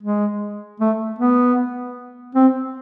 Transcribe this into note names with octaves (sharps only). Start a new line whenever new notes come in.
G#3
A3
B3
C4